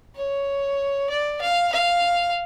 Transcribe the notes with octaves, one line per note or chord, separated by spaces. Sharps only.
C#5
D5
F5
F5